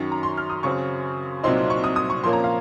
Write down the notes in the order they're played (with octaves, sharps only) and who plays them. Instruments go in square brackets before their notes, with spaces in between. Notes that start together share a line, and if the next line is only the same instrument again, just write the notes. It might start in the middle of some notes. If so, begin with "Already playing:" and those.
Already playing: [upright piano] F#2 D#3 F#3 C#6
A#5
C6
F6
D#6
F#2 C#3 F#3 C4 C#6
C2 A#2 F#3 C4 D#4 C6
C#6
D#6
D#6
C#6
A#2 F3 A#3 C#4 C6
A#5
F5